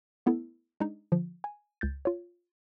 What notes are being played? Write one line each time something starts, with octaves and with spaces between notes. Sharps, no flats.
A3 B3 E4 A4
G#3 D4 D#4
D3 F3
G#5
C#2 G6 A6
F4 C#5